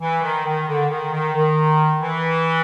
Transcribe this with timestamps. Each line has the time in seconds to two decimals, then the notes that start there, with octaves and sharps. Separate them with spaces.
0.01 E3
0.22 D#3
0.45 D#3
0.68 D3
0.89 D#3
1.12 D#3
1.34 D#3
2.02 E3